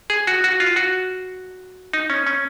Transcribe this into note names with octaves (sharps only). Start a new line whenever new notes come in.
G#4
F#4
F#4
F4
F#4
D#4
C#4
C#4